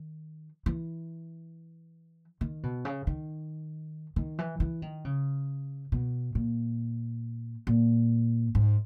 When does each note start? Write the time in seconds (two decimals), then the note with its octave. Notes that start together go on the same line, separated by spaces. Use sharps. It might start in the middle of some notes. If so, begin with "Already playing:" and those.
Already playing: D#3
0.66 E3
2.41 D#3
2.63 B2
2.85 C#3
3.07 D#3
4.16 D#3
4.39 E3
4.60 E3
4.82 D#3
5.05 C#3
5.92 B2
6.35 A#2
7.67 A#2
8.55 G#2